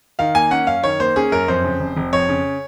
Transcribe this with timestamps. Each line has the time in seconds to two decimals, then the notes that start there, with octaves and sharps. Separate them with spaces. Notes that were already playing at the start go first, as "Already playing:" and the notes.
0.19 D#3 F5
0.35 A#3 G#5
0.51 C#4 F#5
0.67 F#2 F5
0.83 D#3 C#5
1.00 A#3 C5
1.16 C#4 G#4
1.32 F#2 A#4
1.48 F2 C5
1.64 C#3
1.80 F1
1.96 F1
2.13 F2 C#5
2.29 C#3